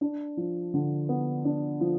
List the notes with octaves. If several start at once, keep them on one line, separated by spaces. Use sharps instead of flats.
D4
F3
D3
B3
D4
F3